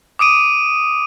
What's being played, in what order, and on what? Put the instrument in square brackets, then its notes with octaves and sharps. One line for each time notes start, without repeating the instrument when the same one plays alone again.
[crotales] D6 D#6 D7 D#7